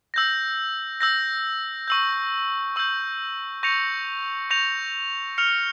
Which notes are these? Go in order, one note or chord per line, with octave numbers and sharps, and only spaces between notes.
E6 G6 A#6
E6 G6 A#6
C#6 E6 G6
C#6 E6 G6
C#6 G6 A#6 C#7 F7
C#6 G6 A#6 C#7 F7
F6 C#7 F7